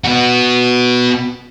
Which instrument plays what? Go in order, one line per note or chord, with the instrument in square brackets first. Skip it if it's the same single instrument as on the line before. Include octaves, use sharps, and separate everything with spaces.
[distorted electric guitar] B3 F#4